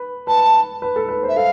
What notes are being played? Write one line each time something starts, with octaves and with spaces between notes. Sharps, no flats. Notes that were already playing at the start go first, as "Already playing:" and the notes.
Already playing: B4
B4 A5
B4
A4
B4
C5
E5
A4 F5